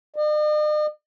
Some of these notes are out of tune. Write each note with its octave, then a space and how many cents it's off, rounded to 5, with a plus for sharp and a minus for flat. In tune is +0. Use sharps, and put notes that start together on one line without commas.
D#5 -45